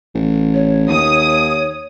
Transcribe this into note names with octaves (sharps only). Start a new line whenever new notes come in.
A1
C#5
D#2 D#6